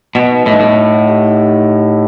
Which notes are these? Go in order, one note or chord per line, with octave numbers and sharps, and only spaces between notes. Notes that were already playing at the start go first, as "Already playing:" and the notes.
B2 D#5
D#4
A2 D#5
G2
A2 D#5
D#5
F#5
G4
D#4